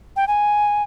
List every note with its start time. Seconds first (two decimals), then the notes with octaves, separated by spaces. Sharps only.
0.16 G5
0.28 G#5